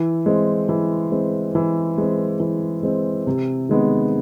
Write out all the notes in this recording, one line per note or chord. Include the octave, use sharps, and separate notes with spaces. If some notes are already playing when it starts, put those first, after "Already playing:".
Already playing: E3
G#3 C4
E3
G#3 C4
E3
G#3 C4
E3
G#3 C4
C3
D#3 G#3 B3